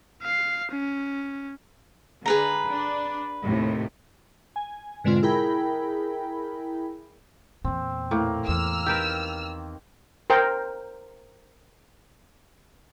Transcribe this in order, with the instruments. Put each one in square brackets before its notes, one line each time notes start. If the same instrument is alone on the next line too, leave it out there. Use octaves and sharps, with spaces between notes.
[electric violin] F5 C7
C#4
[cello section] D3 [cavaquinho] G#4 B4 A#5
[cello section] D4
D#2 A2 C3
[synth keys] G#5
G#2 B2 D3 G#3 C4 F4
E4 G#4 A#4 G5 B5
[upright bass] E2 A#2 [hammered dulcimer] C4
[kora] A2 [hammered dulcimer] A#3
[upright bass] E2 [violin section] E6 F6
[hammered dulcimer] D#3 [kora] G4 A#4 B4
[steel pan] A#4 C5 G5